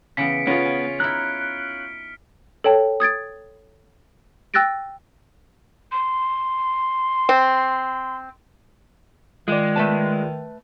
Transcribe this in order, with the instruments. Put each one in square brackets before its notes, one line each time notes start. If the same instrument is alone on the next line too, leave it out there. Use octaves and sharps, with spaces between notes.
[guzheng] C#3 E3 B3 [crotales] B6 C#7 D7
[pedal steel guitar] B3 [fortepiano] C#4 F4 [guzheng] D#5 [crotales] D7
[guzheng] G#5
[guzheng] D#4 E4 [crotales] F6 [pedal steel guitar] F#6
[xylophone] A4 C#5 G5 A5
D#6 G#6 A6 D7
G5 E6 F#6 A6 A#6 D7
[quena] C6
[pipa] C4
[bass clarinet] D#3 [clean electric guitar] G#3 [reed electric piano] F4 D5
[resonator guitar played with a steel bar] A3 B4 A5